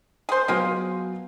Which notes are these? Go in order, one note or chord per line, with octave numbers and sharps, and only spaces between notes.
G#4 C5
F#3 A#3 B3 F4 G#4